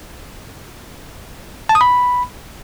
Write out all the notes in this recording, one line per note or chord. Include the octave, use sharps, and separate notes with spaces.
A5
D#6
B5